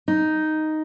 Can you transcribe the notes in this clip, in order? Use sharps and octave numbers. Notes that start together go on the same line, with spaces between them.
D#4